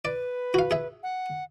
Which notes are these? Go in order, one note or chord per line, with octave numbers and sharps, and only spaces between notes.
B4 D5
F#4 F5
G#4 E5
F#5